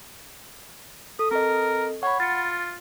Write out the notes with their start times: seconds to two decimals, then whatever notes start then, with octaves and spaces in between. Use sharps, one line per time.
1.19 A4 D#6
1.31 C4 A4 A#4 D#5
2.03 C#5 F#5 B5
2.20 F4 A6 C#7